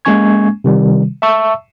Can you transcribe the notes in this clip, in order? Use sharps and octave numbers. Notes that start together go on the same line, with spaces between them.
G#3 A#3 C#4 G#5 C#6 G#6
C3 D#3 G3
E5 A5 C#6 E6